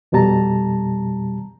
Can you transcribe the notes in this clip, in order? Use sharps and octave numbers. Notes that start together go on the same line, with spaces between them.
F2 B2 G3 A5 A#5